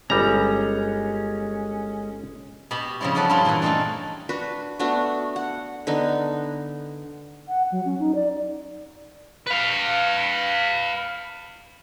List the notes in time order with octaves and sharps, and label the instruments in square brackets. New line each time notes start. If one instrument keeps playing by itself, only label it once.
[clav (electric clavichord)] G1 G3 A#5 [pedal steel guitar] G#3 C#4
[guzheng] B2 G4 B5
C#3 F3 G3 C4 E4
F3 C#4 A4 D5 F#5 A5
G2 E4 F4 A4
A#2 E3 A#4 B4
A3 C4 D4 D#4 G#4 A4
[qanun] D4 F#4 B4
A3 B3 D4 F#4
F#5
D3 B3 D#4
[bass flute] F#5
F#3
C#4
D#4
D5
[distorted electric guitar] B4 F5